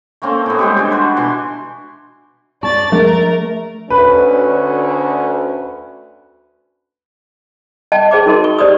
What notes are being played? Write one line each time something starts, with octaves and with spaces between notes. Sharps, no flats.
A3 A#3 C4 C#4
A2 B3
G3 G#3 G4 C5
E3 B3 D4
F#4 B4 C5
B2 E3 C6
D5 A5 C#6 A6
F3 A3 G#4 A#4
D2 C#4 B4
D#5 G5 A5
G#4 C5 D#5 G5 D6
D#4 F#4 A#4 C6
C#6
G4 C5 D5 C#6 D#6